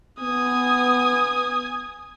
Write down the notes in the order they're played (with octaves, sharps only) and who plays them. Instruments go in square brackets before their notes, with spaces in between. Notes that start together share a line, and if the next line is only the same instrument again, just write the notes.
[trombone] B3 [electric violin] G#5 D#6